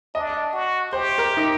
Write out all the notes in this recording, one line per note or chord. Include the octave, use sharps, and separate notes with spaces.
D4 D#5
F#4
G4 C5
A#4
D#4